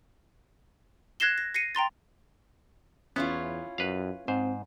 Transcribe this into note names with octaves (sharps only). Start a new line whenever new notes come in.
F#6 G#6 A#6 C7 E7 G7
A#6
A#6 C7 C#7 D#7
G5 A#5 C6 A6
E2 B3 C#4 E4 F4
F#2 B4 F5
G#2 C4 C5